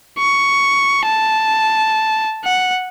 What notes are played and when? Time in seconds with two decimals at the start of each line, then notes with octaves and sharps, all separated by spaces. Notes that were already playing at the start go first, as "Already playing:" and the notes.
0.19 C#6
1.06 A5
2.45 F#5